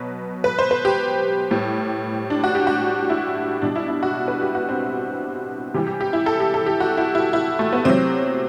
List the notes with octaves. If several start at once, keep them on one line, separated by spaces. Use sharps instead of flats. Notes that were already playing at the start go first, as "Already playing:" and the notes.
Already playing: B2 F#3 B4
B4
C5
B4
G4
A2 G3
D4
F#4
G4
F#4
E4
B2 G3 D4
E4
E4
F#4
B4
G4
F#4
C4
C3 E3 G3 G4
G4
G4
E4
A4
G4
A4
G4
F#4
E4
E4
E4
A3
B3
C3 F#3 C4